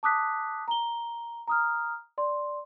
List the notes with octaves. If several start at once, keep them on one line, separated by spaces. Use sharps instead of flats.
A5 D6 D#6 F#6 B6
A#5 G7
A#5 D#6 F6
D5 C6